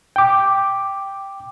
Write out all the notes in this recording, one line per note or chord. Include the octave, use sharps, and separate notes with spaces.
G5 D6